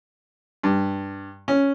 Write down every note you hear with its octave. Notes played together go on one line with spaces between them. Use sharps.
G2
C#4